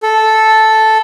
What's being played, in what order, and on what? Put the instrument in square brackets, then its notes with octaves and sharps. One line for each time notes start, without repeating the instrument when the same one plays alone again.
[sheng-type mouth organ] A4